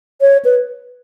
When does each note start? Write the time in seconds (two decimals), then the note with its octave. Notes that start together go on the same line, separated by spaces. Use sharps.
0.21 C#5
0.45 B4